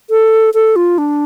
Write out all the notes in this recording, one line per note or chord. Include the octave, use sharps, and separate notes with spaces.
A4
A4
F4
D4